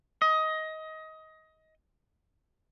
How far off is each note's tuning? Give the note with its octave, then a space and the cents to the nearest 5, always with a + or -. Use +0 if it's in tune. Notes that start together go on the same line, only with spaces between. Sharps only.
D#5 +20